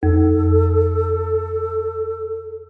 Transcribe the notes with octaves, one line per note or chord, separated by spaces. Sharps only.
F2 A4